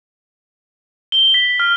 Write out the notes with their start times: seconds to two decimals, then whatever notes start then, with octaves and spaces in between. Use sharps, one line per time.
1.12 G7
1.34 B6
1.60 F6